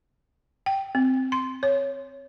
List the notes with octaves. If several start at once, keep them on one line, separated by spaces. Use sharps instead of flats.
G5
C4
C6
C#5